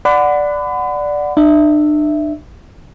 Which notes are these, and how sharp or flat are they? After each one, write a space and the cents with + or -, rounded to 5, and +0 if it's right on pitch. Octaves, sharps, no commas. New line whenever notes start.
D5 +0 F#5 -5 B5 +35
D4 +40 E5 +0